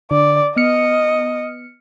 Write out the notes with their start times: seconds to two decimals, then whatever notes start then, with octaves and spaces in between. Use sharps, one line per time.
0.11 D3 D5
0.57 B3 D#5 F6 C#7